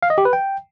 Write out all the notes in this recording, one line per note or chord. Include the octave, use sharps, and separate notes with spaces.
F5
D#5
G4
B4
G5